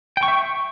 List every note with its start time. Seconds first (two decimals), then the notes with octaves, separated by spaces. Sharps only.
0.17 G5
0.23 C#6
0.28 E5
0.33 C#6